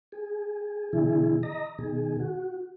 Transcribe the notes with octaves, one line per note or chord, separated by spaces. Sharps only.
G#4
B2 D3 E3 E4 G#4
D#5 A#5
B2 D#3 G#4
F#4